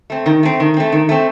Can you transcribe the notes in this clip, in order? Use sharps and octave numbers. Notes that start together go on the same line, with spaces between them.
A3 C4
D#3
A3 C4
D#3
A3 C4
D#3
A3 C4